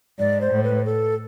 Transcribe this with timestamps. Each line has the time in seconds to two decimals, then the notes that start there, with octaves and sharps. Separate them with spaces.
0.19 G#2 D5
0.41 C5
0.52 A2
0.64 B4
0.85 A4